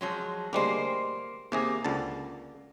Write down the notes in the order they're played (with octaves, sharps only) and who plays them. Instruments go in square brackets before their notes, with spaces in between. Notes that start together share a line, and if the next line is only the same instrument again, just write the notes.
[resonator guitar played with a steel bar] F3 F#3 G#3
[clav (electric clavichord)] D2 G3 G#3 [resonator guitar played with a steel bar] A#3 C5
[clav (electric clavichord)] D#2 C3 G#4 [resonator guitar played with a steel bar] A#3
[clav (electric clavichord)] C#2 D3 A5